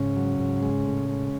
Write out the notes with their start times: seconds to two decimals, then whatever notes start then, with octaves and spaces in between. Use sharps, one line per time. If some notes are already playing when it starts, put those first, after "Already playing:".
Already playing: G#2 C#3 C#4
0.16 F#3
0.39 G#2
0.63 G#3
0.86 A2
1.09 G#3